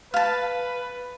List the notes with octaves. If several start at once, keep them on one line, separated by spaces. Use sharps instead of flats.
B4 F5 A5